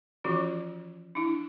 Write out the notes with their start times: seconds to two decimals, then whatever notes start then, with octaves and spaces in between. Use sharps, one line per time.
0.24 E3 F3 C#4 F4 F#4
1.15 D4 E4